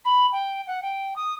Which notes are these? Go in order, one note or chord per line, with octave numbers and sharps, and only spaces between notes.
B5
G5
F#5
G5
D#6